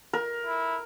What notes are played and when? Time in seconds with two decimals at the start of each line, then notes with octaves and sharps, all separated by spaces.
0.13 A#4
0.46 E4